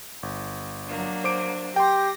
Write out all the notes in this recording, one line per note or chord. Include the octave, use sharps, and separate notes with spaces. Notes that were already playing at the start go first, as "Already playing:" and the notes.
G1
F#3 A#3 D4
C5 D6 D7
G4 G5 C6 A#6